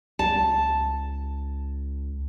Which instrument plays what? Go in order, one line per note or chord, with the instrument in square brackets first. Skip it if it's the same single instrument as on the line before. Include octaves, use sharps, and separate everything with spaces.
[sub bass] C#2 [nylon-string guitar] A5